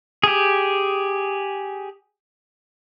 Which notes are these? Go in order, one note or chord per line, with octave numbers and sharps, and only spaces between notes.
G4 G#4